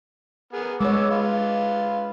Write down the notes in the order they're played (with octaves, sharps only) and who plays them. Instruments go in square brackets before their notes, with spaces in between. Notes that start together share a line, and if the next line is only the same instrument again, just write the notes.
[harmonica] B3 G#4 A#4
[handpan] G#3 C#5 [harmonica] B3 D6 E6
[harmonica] F4 B4